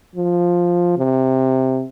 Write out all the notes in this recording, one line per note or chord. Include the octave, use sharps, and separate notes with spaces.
F3
C3